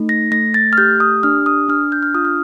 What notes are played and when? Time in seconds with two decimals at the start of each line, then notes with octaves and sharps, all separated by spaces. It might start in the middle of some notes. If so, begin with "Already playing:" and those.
Already playing: A3 D#4
0.09 A#6
0.31 A3 A#6
0.54 A6
0.73 F6
0.78 G4 G6
1.00 D#6
1.23 D4 F6
1.46 D#6
1.68 D4 F6
1.92 G6
2.02 F6
2.14 F4 D#6
2.25 F6